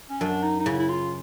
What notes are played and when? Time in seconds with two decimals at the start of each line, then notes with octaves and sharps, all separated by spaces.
0.10 C#4
0.21 F#2 D4
0.44 D#4
0.60 D#4
0.66 C#3 E4
0.79 E4
0.89 F4